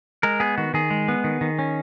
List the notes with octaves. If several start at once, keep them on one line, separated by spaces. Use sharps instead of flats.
G#3 A#4
B3 G#4
D#3 F#4
D#3 G#4
G#3
B3
D#3
D#3
C#4